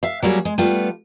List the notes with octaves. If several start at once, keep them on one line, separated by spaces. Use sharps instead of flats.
E5 F5
F#3 G3 A#3 F#4 G#4
G#3
G3 A3 B3 F4